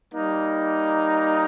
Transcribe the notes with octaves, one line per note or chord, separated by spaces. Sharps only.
G3 A#3 D#4